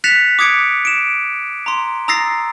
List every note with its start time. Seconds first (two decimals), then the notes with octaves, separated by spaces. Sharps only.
0.04 F#6 A6 B6 C#7 E7 F7
0.39 D6 D#6 G#6 C#7 D7
0.85 D7 E7
1.66 A#5 C6
2.08 A#5 D#6 E6 A6 A#6 C7